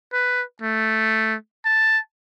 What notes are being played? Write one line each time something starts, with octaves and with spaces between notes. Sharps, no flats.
B4
A3
A5